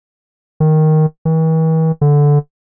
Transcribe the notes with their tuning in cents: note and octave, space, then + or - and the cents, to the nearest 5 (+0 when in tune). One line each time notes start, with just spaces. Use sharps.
D#3 +0
E3 -45
D3 -10